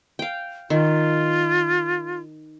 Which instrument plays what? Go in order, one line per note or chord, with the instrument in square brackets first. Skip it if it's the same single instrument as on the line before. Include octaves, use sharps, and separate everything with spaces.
[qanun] F5 G5
[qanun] D#3 [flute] F4